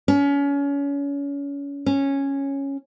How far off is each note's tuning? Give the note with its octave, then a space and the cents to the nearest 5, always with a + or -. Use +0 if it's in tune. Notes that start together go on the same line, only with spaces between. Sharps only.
C#4 +30
C#4 -5